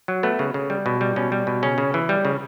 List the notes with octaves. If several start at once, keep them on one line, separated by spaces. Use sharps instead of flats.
F#3
A3 B3
C#3
C#3
G3
B2
G3
B2 C#4
G3
B2
C#3 C#4
C#3
E3
G3
C#3